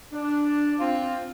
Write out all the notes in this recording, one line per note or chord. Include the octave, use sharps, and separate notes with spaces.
D4
C4 F4 C5